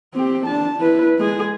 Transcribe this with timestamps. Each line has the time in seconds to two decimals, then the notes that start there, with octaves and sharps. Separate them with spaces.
0.14 C4 G4
0.46 D4 A5
0.78 E4 B4
1.18 G#3 G#4